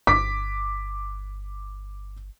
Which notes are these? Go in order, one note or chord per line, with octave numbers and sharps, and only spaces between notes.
G1 D6 B6